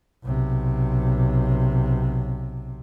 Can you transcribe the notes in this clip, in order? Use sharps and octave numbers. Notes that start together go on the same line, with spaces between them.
B1 C3